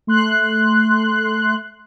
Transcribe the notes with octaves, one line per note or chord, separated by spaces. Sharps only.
A3 C6 F#6